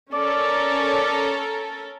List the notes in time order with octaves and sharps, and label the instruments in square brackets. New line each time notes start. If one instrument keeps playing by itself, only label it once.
[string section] C#4 A4 A#4 [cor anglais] D5